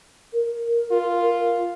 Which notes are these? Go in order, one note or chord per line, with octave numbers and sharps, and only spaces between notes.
A#4
F4